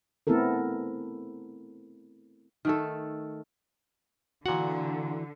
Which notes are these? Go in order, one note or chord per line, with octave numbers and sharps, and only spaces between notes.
A3 B3 C4 E4 A4 A#4
D#3 A3 A4
A#2 D3 E3 F#4 F#5